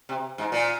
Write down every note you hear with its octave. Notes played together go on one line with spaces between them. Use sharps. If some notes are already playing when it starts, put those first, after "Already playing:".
C3
G#2
A#2